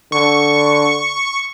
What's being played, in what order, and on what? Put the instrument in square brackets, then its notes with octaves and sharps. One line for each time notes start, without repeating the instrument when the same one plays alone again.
[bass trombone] D3 [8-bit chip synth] C#6